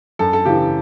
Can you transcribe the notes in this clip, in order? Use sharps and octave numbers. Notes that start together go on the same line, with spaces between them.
F#2 A4
A4
C#3 E3 G4